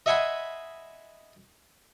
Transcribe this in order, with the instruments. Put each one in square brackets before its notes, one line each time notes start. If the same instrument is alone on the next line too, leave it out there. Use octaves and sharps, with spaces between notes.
[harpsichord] D#5 E5 F#5 G#5 B5 C6